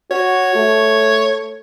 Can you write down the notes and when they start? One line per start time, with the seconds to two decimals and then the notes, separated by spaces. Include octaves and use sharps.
0.11 F#4 C#5
0.55 A3